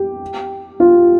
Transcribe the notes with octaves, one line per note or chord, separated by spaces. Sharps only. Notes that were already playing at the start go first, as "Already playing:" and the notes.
Already playing: G4
F4